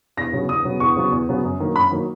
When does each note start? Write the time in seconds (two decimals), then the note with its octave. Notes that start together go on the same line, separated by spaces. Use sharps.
0.17 E2 A#6
0.33 C#3 F#3 B3
0.49 E2 D#6
0.65 C#3 F#3 B3
0.80 E2 C#6
0.96 C#3 F#3 B3
1.12 E2
1.29 C#3 F#3 B3
1.44 F#2
1.60 D#3 F#3 A#3
1.76 F#2 B5
1.92 D#3 F#3 A#3